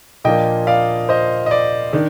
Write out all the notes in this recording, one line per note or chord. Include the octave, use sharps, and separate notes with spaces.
A#2 F3 A#3 D4 F4 D#5 G5
D5 F5
C5 D#5
D#5
D5
D#3 D4